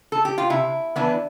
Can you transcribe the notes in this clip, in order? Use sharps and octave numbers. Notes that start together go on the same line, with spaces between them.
A4
G4
F4
C3 E4
E3 B3 D4